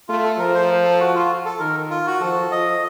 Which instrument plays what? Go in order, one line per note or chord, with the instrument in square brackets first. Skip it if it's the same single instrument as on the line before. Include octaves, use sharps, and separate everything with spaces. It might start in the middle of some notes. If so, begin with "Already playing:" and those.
[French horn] A3 [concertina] F4
[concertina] A4
[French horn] F3 [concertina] A#4
[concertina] C5
A4
F#4
F4
A4
[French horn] D#3 [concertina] A#4
[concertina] F4
F#4
[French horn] F3 [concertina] A4
[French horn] F3 [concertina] D#5